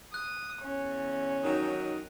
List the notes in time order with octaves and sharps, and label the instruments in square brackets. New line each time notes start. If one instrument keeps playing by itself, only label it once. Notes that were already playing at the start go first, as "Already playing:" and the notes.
[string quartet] D#6 [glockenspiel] F#6
[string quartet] E2 C#4
[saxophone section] D#3 F#3 D#4